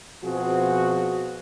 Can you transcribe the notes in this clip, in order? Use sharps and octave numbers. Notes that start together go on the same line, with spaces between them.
B2 F3 C4 F#4 G#4